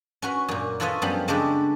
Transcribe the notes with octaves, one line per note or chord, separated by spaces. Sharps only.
C#4 F#4 B4
F#2 A#2
E4 F4 A4 B4 C#5 D#5
F#2 F3 G3 B3
C#3 G#3 D4 G4 A4 B4